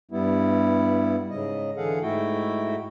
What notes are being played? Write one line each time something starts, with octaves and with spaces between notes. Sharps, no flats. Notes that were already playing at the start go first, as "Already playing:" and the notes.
G2 G3 B3 E4
G#2 C#3 D#5
D3 E3 G#4 A4 F5 F#5
G#2 A3 E4 F#4 G5